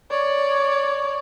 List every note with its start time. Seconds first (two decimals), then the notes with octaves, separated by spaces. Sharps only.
0.11 C#5 D5